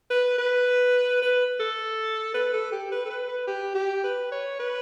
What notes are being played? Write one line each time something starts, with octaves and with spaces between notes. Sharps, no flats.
B4
B4
B4
A4
B4
A4
G4
B4
A4
B4
B4
G4
G4
B4
C#5
B4